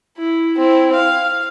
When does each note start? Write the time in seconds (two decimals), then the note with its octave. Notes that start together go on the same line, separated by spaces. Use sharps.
0.18 E4
0.57 C4 E4
0.95 F5